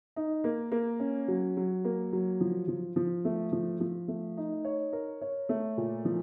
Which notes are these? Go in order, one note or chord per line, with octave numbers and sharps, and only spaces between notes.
D#4
A#3
A#3
C#4
F#3
F#3
A#3
F#3
F3
F3
F3
A3
F3
F3
A3
D#4
C#5
A#4
C#5
A3
A#2
F3